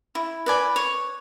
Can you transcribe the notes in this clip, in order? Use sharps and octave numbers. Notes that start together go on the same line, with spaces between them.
E4
B4 D5 G#5
C#5